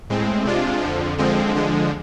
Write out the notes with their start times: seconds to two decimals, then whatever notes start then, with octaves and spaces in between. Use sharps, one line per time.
0.10 A2 G#3 C4
0.45 C3 G#3 D4 F4
0.82 F2 D3 F3
1.18 D3 F3 G#3 C4
1.55 D3 F3 G#3